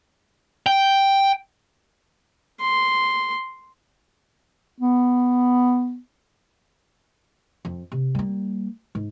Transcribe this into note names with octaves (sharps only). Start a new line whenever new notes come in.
G5
C6
B3
F2
C3
G3 A#3
G#2